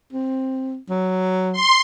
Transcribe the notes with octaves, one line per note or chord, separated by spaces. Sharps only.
C4
F#3
C6